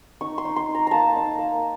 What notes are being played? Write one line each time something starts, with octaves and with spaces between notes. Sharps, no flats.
D#4 C#6
C6
D#4
C6
D#4
A#5
A#3 A5 A#5
D#4
A#3